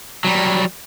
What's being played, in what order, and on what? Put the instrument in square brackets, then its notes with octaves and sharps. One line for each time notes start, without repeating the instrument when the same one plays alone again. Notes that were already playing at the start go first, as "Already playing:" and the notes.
[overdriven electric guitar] F#3 G3